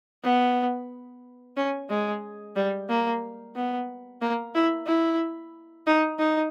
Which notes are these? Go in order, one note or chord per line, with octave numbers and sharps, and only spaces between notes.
B3
C#4
G#3
G3
A#3
B3
A#3
E4
E4
D#4
D#4